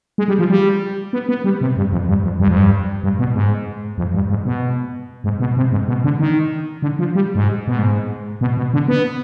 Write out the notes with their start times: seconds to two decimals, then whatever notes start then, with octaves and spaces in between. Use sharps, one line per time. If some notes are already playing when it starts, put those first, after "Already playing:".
0.18 G#3
0.28 G3
0.39 F3
0.50 G3
1.13 B3
1.29 B3
1.44 G3
1.61 C3
1.77 G2
1.92 F2
2.09 G2
2.24 F2
2.40 G2
2.48 F2
2.56 G2
3.03 G2
3.19 B2
3.34 G#2
3.98 F2
4.15 G2
4.30 G#2
4.45 B2
5.24 G#2
5.40 B2
5.57 C3
5.72 G#2
5.88 B2
6.04 D3
6.19 D#3
6.82 D3
6.99 F3
7.15 G3
7.35 G#2
7.68 B2
7.79 G#2
8.41 B2
8.57 B2
8.74 D3
8.88 B3